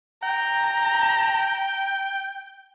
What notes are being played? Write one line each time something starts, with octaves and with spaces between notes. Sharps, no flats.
G5 A#5